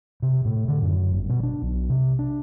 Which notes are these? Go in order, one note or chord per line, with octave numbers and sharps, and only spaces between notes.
C3
A2
D3
F#2
G1
B2
D4
B1
C3
D4